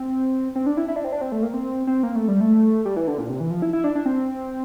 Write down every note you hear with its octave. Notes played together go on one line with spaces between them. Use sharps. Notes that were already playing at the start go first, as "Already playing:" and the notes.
Already playing: C4
C4
D4
E4
E4
D4
C4
D4
C4
A3
A#3
C4
C4
A#3
A3
G3
A3
G3
E3
D3
A#2
C3
E3
F3
E4
E4
D4
D4
C4